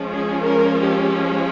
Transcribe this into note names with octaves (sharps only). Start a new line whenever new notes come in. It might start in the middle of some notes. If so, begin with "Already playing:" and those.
Already playing: F3 G#3 C#4
G#4
A#4
G4